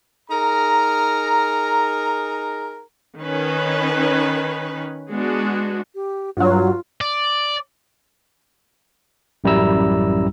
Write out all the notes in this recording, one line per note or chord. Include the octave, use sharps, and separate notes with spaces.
D#4 G#4 A#4 A#5
D#3 C#4 B4
G#3 B3 D4 F#4
G4
G2 F#3 F4
D5
A1 F#2 G3 E4 A#5 E6